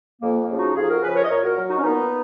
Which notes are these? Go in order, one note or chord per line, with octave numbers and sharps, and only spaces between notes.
F2 A#3
A#3
C#3 F3
D#4 F#4
F2 F4 G#4
F#4 A#4
C#3 F3 G#4 B4
A#4 C#5
D#5
A#2 A#4 C#5
F#4 A#4
F#3
D#4 F#4
C#4
A#2 B3 D#4